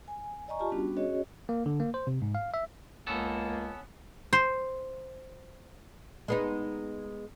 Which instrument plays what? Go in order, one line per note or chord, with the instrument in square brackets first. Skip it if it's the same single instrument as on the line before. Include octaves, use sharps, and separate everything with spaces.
[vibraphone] G#5
D5 D#5 G#5 A#5 C#6
F4 G4 A5
G3 B3 C#4 D4 F#4
C#4 F#4 G#4 C#5 D#5
[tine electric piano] A#3
D3
A#3
C5
C3
G#2
F5
E5
[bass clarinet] C#2 [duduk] A#3 [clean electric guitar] B3 C#4 A4
[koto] C5
[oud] G#3 B3 D#4